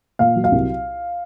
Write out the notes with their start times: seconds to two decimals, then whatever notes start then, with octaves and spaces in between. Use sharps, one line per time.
0.19 A#2 F5
0.36 F#3
0.44 F5
0.52 C2